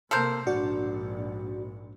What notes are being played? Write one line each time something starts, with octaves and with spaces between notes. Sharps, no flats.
C3 A#3 A4 A#4 C5
A#1 G#2 D4 F#4 D5